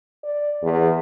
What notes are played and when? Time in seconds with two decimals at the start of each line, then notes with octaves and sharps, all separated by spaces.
0.24 D5
0.63 E2